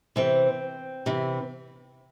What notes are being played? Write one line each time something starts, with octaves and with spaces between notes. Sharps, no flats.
C3 E3 C4
C3 E3